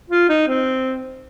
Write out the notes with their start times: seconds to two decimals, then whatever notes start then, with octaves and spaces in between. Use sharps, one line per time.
0.10 F4
0.29 D#4
0.48 C4